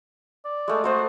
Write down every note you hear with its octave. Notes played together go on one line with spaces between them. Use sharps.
D5
G#3 A3
A3 F#4 C5 D#5